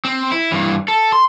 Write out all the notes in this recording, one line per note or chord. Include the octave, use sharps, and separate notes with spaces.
C4
E4
G2 E3
A4
C6